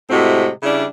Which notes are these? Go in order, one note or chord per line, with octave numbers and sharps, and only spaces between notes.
A2 C3 G#3 C4 F#4
C#3 G3 D4 E4